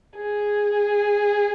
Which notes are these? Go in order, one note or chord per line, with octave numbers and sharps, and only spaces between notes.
G#4